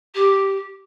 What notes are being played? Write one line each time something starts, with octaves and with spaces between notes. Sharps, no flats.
G4